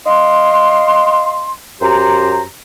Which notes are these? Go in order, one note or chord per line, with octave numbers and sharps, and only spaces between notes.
D#5 F5 C6
F#2 G4 C5 A#5